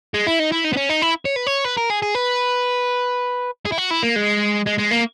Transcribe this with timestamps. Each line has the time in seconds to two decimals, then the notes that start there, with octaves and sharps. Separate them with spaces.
0.14 G#3
0.27 E4
0.40 D#4
0.52 E4
0.65 D#4
0.73 B3
0.77 C#4
0.90 D#4
1.02 E4
1.25 C#5
1.36 B4
1.47 C#5
1.65 B4
1.78 A#4
1.90 G#4
2.03 G#4
2.15 B4
3.66 G#4
3.72 E4
3.78 F#4
3.91 E4
4.03 A#3
4.16 G#3
4.66 G#3
4.78 G#3
4.91 A#3